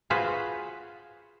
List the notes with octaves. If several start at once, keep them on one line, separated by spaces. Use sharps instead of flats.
F4 F#4 G#4 B4 C5